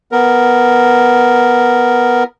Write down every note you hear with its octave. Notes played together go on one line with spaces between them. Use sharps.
B3 A#4